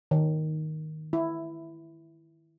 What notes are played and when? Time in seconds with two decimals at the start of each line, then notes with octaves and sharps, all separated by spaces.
0.11 D#3
1.13 E4